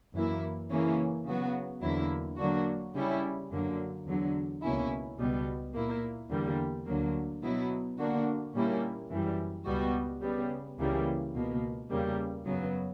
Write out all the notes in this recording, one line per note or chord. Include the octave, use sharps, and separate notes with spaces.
F#2 E3 A#3 E4
C#3 E3 A#3 C#4
C#3 F#3 B3 F#4
E2 D3 F#3 A#3 E4
D3 F#3 A#3 D4 F#4
C#3 G3 C#4 E4
F#2 D3 F#3 A#3
E2 D3 F#3
C#2 B2 A#3 C#4 E4
C#2 B2 G3 B3
A#2 A#3 E4
E2 D3 G3 A#3
D2 D3 F#3 A#3
B2 F#3 B3 E4
D3 A#3 D4 F#4
A#2 G3 A#3 C#4 E4
F#2 E3 G3
C#2 B2 G3 B3 F#4
C#3 G3 B3
C#2 C#3 E3 G3 A#3
C#2 B2 A#3
E2 C#3 G3 A#3
F#2 C#3 F#3 B3